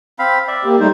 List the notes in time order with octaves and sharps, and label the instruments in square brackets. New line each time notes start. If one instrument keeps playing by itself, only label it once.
[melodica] C4 F5 B5
D5 E5
[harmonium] A#3 G4
[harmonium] G3 A3 D#4 [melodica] C5